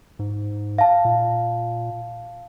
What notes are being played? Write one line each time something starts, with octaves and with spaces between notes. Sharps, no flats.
G#2
F5 A5
A#2